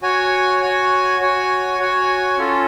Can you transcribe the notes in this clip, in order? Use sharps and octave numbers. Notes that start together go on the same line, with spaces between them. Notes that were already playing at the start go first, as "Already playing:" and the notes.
F#4 C#5 G#5
F#4 C#5 G#5
F#4 C#5 G#5
F#4 C#5 G#5
C#4 F4 A4